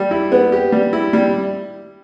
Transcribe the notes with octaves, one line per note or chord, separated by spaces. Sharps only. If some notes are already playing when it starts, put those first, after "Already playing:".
Already playing: G3
E4
B3
G4
G3
E4
G3